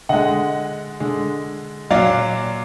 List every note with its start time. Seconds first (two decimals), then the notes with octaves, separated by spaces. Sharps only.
0.09 D3 G#3 D#5 F#5
1.00 D3 G#3
1.90 A#2 F#3 D5 F5